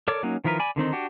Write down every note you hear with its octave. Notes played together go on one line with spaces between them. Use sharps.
A4 A#4 C#5 D5 D6
F#3 A#3 C#4 D#4
D#3 F3 E4 A#4 B4
D5 G#5 B5
D3 D#3 C4 D#4
D4 F#4 G4